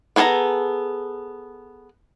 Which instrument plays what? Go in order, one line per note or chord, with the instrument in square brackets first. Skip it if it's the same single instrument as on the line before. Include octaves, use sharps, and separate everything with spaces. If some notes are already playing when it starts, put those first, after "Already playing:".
[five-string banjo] B3 G#4 A4 A5 A#5